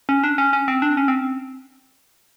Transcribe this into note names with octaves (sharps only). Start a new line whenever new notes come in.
C#4
D4
C#4
C#4
C4
D4
C#4
C4